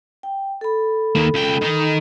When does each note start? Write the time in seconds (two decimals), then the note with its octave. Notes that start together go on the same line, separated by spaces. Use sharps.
0.23 G5
0.61 A4 B5
1.15 D#3 A#3
1.34 C#2 G5
1.61 D#3 D#4